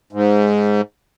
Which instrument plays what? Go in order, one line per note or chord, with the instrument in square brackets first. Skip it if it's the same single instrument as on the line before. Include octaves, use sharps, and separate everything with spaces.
[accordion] G#2